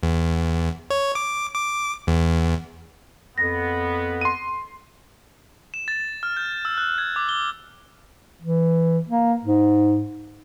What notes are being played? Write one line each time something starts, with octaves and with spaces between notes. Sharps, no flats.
E2
C#5
D6
D6
E2
F2 B3 A#6
C6 D#7
E7
A6
F6
G6
E6
F#6
G#6
D6
G7
E3
A#3
G#2